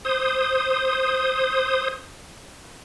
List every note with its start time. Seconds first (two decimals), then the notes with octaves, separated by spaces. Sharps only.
0.05 C5 D#6